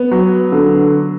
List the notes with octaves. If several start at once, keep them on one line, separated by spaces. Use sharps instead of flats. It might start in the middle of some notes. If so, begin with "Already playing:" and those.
Already playing: B3
F#3
D3